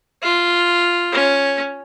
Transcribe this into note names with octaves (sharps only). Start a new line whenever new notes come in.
F4
C#4